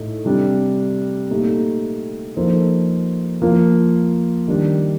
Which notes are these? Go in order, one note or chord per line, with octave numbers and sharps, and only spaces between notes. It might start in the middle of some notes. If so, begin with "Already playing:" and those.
Already playing: A2 A3 D#4
C3 G3 D4
A#2 A3 D#4 G4
F3 A#3 D#4 A4 C5
F3 A#3 F4 A#4
D#3 G3 D4